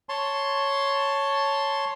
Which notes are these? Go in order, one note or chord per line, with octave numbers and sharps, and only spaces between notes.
C#5 A5 C6